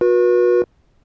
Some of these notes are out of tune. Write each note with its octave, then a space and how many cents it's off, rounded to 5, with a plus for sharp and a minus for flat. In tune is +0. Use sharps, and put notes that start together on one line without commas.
F#4 -35 B4 -35